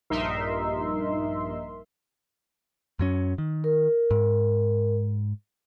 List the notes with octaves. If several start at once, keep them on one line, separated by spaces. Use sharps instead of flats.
A#1 G2 D#4 A#4 E5 C6
F#2 F#3 C#4
D#3
A#4
G#2